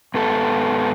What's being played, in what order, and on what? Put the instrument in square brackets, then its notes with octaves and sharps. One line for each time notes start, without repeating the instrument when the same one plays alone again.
[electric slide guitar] G#2 B3 A4